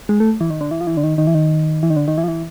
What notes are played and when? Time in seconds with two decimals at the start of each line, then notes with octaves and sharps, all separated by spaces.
0.09 G#3
0.20 A3
0.41 E3
0.50 D#3
0.61 D3
0.71 E3
0.81 F3
0.87 E3
0.97 D3
1.03 D#3
1.18 D#3
1.27 E3
1.35 D#3
1.83 E3
1.90 D#3
1.96 D3
2.08 D#3
2.18 E3
2.24 F3
2.28 E3